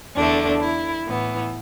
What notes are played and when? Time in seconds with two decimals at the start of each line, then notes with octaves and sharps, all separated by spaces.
0.15 E2 D3 A3 D4
0.60 E4
1.06 A2 E3 B3